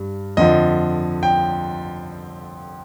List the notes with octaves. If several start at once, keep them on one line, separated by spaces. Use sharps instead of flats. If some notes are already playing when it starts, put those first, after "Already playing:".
Already playing: G2 G3
F2 D3 F3 D#5
G5